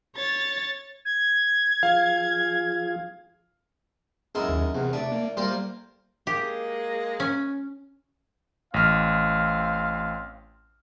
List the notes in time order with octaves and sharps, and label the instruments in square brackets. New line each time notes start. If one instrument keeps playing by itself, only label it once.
[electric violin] C#5 A6
[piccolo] G#6
[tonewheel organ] F3 F4 G#4 [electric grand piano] F5
[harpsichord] F#2 G#3 [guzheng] E4 A#4
[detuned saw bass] D#2
[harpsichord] E2 [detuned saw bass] C3
[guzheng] A3 D5 [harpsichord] D4
[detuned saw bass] A#3
[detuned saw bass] G3 [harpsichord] A#3 F4 C5 [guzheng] G4 A#4
[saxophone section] G#3 A#3 [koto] G4
[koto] C#4
[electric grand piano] A1 F6 [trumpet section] C4 F5